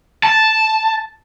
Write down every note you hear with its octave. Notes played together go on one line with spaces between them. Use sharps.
A5